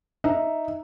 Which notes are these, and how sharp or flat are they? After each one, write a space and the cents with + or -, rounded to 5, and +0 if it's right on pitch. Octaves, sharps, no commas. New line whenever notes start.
D#4 +0 E5 +0